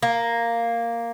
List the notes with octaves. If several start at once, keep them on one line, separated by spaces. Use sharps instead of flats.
A#3